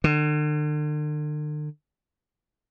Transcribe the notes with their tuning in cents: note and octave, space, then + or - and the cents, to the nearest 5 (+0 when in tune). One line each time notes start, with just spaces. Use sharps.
D3 +40